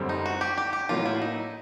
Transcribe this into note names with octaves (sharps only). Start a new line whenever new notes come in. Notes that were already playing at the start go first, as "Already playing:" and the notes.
Already playing: F#2 D3 G3 C4
D#4
F#4
G4
G4
G4
A2 F#3 A#3 F4
E4
D#4